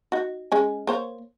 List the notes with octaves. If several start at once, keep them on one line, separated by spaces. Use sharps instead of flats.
D#4 F#4
G#3 C#4 G#5
A#3 C5 C#5